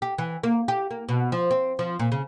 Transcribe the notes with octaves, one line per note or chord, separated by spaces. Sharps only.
G4
E3
A#3
G4
A#3
B2
F3
C4
F3
A#2
C#3